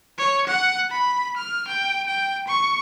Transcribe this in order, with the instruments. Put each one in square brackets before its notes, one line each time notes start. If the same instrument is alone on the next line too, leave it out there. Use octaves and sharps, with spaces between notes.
[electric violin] C#5
F#5
B5
F6
G5
G5
C#6